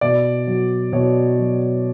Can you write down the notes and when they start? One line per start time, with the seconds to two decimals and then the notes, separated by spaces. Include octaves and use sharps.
0.01 B2 D5
0.47 F#3
0.92 B2 C#5
1.39 F#3